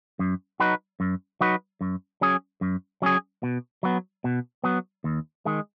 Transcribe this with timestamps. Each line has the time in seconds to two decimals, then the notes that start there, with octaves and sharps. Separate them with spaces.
0.19 F#2
0.60 F#3 D#4 F#4 B4
1.00 F#2
1.41 F#3 D#4 F#4 B4
1.81 F#2
2.21 F#3 C#4 G#4
2.61 F#2
3.02 F#3 C#4 G#4
3.43 B2
3.83 F#3 B3
4.24 B2
4.64 F#3 B3
5.04 D#2
5.45 D#3 G#3